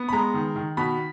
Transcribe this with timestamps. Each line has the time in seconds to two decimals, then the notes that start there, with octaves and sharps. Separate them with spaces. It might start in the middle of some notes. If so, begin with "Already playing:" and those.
Already playing: B3
0.09 B5
0.12 G#3 A#5
0.34 D#3
0.56 D#3
0.77 B2 B5